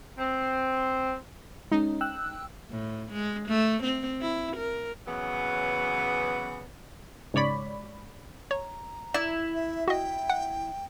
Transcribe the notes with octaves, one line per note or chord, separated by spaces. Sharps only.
C4
G#3 C#4 D#4
G5 E6 F#6
A2
G#3
A3
C4
E4
A#4
C#3 E3 F#3 B3
G#2 C#3 C#5 D5 B5
C#5 A#5
E4 D5
E5
F#4 D#5 G5
F#5